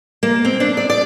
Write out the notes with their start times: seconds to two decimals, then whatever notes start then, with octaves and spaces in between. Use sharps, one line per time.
0.23 A#3
0.45 C4
0.60 D4
0.77 D5
0.90 D5